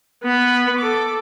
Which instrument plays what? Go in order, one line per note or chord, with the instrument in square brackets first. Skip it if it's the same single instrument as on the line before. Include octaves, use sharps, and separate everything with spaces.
[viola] B3 B5
A4 D6